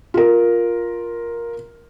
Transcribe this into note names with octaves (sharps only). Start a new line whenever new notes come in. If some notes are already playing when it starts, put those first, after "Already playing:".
F4 A#4